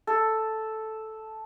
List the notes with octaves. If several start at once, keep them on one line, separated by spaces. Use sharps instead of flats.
A4